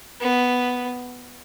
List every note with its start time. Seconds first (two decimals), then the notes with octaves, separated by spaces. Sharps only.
0.20 B3